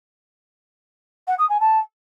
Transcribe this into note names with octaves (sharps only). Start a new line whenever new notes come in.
F#5
D#6
G#5
A5